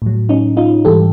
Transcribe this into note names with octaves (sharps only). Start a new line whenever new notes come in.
A2 F#3
C#4 D#4
D#4 F4
G#2 E3 G3 G4 A4